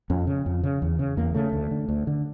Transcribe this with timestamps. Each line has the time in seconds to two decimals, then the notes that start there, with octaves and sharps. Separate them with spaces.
0.10 F2 C#4
0.27 C#3
0.46 F2
0.64 C#3
0.82 E2
0.99 C#3
1.17 E2 A#3
1.35 C#3 A3
1.53 D2
1.71 D3
1.89 D2
2.07 D3